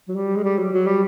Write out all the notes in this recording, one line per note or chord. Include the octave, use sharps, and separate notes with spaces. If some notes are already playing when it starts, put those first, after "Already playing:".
F#3
G3
G#3
G3
F#3
F#3
G3